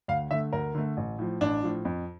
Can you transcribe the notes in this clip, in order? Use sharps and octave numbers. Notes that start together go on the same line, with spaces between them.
D2 F5
D3 A3 E5
D2 A#4
D3 A3
A1
A2 F3
A1 D4
A2 F3
F2